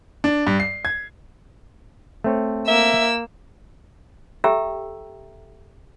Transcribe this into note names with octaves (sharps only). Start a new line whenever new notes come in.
D4
G2
C7
G#6
A3 C4 C#5
A#3 E5 E6
G4 A4 E5 G5 A#5 E6